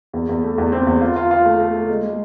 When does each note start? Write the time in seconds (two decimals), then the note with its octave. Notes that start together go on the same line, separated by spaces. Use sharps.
0.13 E2
0.29 E2
0.43 A3
0.58 E2
0.72 C4
0.87 E2
1.01 F4
1.16 F4
1.31 F4
1.45 A3
1.60 A3
1.74 A3
1.89 G#3
2.03 G#3